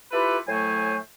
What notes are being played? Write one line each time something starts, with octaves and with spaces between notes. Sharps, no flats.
E4 F4 G4 A4 B4
A2 F#3 A3 C5 G#5